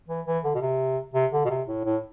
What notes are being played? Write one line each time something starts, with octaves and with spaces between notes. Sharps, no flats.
E3
E3
D3
B2
C3
C3
D3
B2
C3
A2
A2